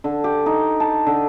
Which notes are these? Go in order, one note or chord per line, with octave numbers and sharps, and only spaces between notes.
D3
G4
D#4
A5
D3